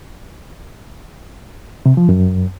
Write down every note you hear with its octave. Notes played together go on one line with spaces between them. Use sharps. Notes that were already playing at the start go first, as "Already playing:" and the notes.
C3
F3
F#2